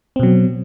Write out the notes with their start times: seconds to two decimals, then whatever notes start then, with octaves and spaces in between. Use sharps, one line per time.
0.16 C4
0.20 B2
0.23 F#3